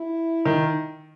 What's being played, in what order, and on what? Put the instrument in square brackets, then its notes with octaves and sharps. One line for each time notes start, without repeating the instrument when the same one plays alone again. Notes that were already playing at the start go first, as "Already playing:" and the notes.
Already playing: [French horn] E4
[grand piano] D#3